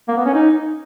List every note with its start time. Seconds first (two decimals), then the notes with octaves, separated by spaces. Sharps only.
0.08 A#3
0.17 B3
0.25 C#4
0.34 D#4